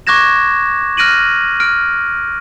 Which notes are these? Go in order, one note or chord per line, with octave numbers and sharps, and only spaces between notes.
C#6 D6 F#6 G#6 A#6 E7
F6 F#6 A#6 D7 D#7 F#7
F6 D7